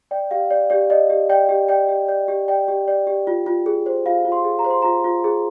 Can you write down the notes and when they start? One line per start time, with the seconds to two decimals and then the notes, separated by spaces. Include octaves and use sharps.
0.11 D5 G5
0.31 G4 F5
0.51 D5
0.70 G4 D5
0.90 D5 D#5
1.10 G4
1.30 D5 G5
1.49 G4
1.68 D5 G5
1.88 G4
2.09 D5
2.28 G4
2.48 D5 G5
2.68 G4
2.88 D5
3.07 G4
3.27 F4
3.46 F4
3.66 G#4
3.86 C5
4.06 F4 F5
4.25 F4
4.32 C6
4.45 G#4
4.59 A#5
4.65 C5
4.70 C6
4.82 F4 A#5
5.04 F4
5.24 G#4